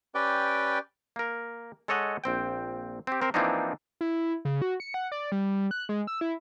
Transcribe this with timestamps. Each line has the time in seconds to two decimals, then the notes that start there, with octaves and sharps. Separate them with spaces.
0.15 C#4 G4 B4 D5 G5
1.16 A#3 A#4
1.88 G#3 A4 C#5 D#5 F#5
2.24 A#1 C4 G5
3.07 C4 G4
3.22 C4 A#4 C5
3.34 E3 F3 A#3 C4 D4 D#4
4.01 E4
4.45 C#3
4.62 F#4
4.80 C#7
4.94 F#5
5.12 D5
5.32 G3
5.71 F#6
5.89 G#3
6.07 E6
6.21 E4